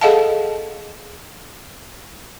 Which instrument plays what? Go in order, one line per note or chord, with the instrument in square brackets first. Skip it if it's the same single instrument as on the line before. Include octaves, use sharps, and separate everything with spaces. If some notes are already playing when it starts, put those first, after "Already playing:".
[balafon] G#4 A4 D#5 F5 F#5 A5